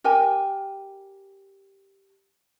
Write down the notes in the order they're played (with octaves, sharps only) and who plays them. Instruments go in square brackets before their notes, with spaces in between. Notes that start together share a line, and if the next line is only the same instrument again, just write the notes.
[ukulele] G4 A#4 G5 G#5